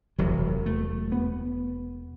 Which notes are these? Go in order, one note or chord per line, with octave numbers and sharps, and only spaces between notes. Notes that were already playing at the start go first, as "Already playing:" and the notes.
E1 E2 C3 F#3
A3
B3